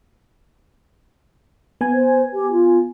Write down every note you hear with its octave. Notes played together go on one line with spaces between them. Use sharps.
B3 G#5
C5
G4
F4